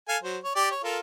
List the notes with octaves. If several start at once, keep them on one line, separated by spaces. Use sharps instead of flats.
A4 F5 G#5
F#3 C5
C#5
G4 D5
C#5
F4 A4 A#4